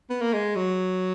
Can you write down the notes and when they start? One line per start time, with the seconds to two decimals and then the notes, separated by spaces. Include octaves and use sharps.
0.10 B3
0.21 A#3
0.33 G#3
0.56 F#3